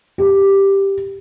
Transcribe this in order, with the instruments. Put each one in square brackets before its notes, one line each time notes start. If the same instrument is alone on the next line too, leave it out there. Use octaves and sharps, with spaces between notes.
[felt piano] G4